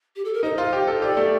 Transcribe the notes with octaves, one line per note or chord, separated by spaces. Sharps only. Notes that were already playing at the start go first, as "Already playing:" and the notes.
G4
A4
A#4
D#4 C5
F4
G4
A4
G4 D5
A3